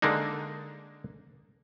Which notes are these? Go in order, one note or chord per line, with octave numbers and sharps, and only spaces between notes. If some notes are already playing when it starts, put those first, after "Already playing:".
D3 G#3 A#3 D4 D#4